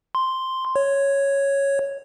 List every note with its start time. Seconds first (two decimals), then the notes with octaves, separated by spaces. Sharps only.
0.15 C6
0.76 C#5